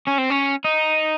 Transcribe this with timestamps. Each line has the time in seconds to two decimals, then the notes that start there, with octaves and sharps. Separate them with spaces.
0.07 C#4
0.18 C4
0.30 C#4
0.64 D#4